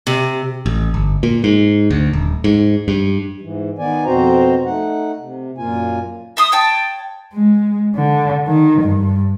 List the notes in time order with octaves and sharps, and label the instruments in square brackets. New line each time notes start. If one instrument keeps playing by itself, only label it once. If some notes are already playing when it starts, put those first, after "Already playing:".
[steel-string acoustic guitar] C3
[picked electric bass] A1
G1
A#2
G#2
D2
D#1
G#2
G2
[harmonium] G#2 E3
D#3 B3 D5 G#5
F2 B2 C4 F#4 C5 A#5
A3 D#4 F#5
C3
F#2 A#2 A#3 F4 G#5
[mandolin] E5 C6 D#6
C#5 G5 A5
[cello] G#3
D3
D#3
G2